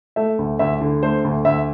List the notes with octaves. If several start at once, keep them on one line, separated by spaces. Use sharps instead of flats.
A3 E5
D2
D2 E5
D3
A3 C5
D2
D2 E5